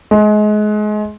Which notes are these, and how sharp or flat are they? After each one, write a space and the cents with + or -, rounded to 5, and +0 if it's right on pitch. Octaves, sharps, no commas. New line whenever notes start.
G#3 +30